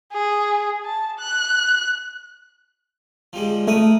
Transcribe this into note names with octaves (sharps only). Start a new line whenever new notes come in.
G#4
A5
F#6
F3 G3 G#3
A3 A#4 B4 D#6